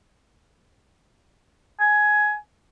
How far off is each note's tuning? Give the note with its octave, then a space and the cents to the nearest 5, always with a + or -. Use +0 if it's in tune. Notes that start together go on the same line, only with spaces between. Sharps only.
G#5 +15